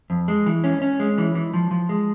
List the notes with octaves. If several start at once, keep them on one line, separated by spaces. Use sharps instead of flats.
F2
G#3
E3
C#4
C#4
G#3
E3
E3
F3
F3
G#3